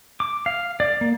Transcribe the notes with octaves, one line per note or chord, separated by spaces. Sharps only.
D6
F5
D5
A#3